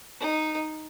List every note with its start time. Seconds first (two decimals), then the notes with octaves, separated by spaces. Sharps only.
0.21 D#4